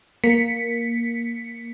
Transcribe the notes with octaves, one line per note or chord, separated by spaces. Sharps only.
A#3 B6 C#7